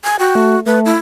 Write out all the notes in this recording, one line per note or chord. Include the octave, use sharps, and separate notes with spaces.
G#5
F#4 G5
A3
A3 B4
E4